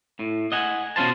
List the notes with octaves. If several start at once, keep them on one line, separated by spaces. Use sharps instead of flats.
A2
D#5 F#5 G#5
B2 C#4 F4 C5 A5